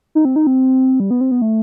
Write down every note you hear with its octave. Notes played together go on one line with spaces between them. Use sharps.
D#4
C4
D#4
C4
G3
B3
C4
B3
A3